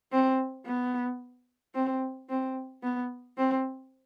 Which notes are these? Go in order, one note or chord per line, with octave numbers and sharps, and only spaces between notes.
C4
B3
C4
C4
B3
C4